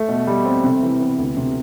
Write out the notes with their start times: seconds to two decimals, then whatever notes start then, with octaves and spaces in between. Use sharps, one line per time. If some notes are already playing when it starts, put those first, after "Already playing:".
Already playing: A3
0.09 B2
0.27 G3
0.45 C4
0.64 C3
0.83 E3
1.00 B3
1.18 D2
1.37 C3